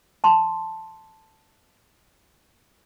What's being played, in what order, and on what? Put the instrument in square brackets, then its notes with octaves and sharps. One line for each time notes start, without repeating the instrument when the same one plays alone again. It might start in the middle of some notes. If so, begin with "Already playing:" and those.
[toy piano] A5 C6